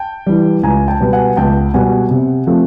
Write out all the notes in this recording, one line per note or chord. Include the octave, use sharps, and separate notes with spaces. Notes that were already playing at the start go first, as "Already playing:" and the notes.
Already playing: G5 A5
E3 G3
C#2 G#5 A#5
G5 A5
B2 G3 B3
F#5 G#5
C#2 G5 A5
B2 G3 B3 F#5 G#5
C3
F3 A3 C4